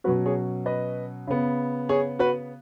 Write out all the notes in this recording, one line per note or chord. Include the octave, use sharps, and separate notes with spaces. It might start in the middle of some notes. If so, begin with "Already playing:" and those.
B2 F#3 C#4 F#4 B4
G#4 C#5
B4 D#5
C#3 B3
G#4 C#5
F#4 B4